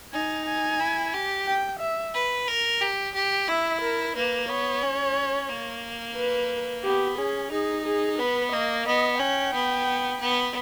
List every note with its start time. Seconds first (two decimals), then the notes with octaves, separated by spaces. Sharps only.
0.13 D#4 G#5
0.46 G#5
0.80 E4
1.14 G4
1.46 G5
1.80 E5
2.14 B4
2.48 A#4
2.81 G4
3.15 G4
3.48 E4 E5
3.82 A#4
4.16 A#3 B4
4.49 B3 C#5
4.83 C#4
5.49 A#3
6.17 B4
6.84 B3 G4
7.18 C#4 G#4
7.51 D#4 G#4
7.86 G#4
8.19 B3 B4
8.52 A#3 D#5
8.85 B3 D#5
9.19 C#4 G5
9.54 B3
10.20 B3